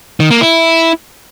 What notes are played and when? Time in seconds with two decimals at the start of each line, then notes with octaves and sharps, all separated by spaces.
0.20 D#3
0.31 A#3
0.41 E4